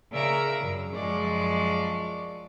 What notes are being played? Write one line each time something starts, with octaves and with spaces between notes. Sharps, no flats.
C#3 A#4 D5 E5 A#5 E6
F#2 C#3
F#2 F3 G#3 D5 C#6